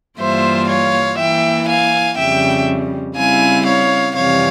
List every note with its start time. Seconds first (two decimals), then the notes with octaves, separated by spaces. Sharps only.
0.19 G2 E3 G3 A#3 F4 C5 E5
0.69 C#5 F5
1.18 E3 A#3 E4 E5 G5
1.68 F5 G#5
2.18 F2 C#3 G3 E5 G5
3.17 C#3 G3 C4 E4 F5 G#5
3.66 C#5 F5
4.16 F2 C3 E3 G3 C#5 F5